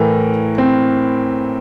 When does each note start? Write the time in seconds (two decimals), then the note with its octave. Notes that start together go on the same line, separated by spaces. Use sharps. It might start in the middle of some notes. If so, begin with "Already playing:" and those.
Already playing: A2 E3 A#4
0.58 C4